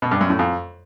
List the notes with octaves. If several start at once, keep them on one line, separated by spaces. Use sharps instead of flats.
B2
G2
F#2
A2
F2